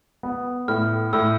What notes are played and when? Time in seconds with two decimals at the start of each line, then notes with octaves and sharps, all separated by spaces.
0.23 B3
0.68 A2 F6
1.13 A2 E6